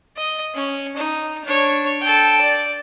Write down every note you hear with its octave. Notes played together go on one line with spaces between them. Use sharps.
D#5
C#4
D#4
D4 C#5
A4 G5
D5